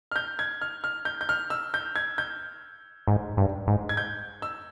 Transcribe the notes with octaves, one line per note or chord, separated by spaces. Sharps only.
F6
G6
G#6
F6
F6
G6
G6
F6
E6
G6
G#6
G6
G#2
G2
G#2
G#6
G6
E6